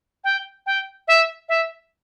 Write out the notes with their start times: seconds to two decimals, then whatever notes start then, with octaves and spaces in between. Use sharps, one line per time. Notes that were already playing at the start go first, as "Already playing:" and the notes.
0.24 G5
0.66 G5
1.08 E5
1.49 E5